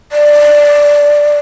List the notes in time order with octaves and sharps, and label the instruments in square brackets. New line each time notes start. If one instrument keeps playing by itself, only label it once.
[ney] D5